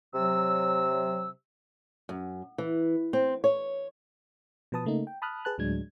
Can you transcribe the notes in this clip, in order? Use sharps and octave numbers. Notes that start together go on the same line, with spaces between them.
C3 F#3 E6
F#2
E3
C4
C#5
B2 F3 B4 A5 D#6
C#3 A3 A#3 D#4
G5
A5 B5 D#6 F6 F#6
G#4 B4 A5 F#6
D2 A2 F#3 G#3 D4 G#6